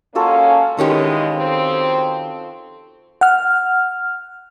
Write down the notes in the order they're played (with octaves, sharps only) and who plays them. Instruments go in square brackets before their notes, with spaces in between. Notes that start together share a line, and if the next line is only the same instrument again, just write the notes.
[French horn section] G#3 A#3 C#4 [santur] F4 F#4 A4
[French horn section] B2 E3 G#3 [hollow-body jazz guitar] D#3 C#4 G4
[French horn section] F2 C4
[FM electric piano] F#5 F6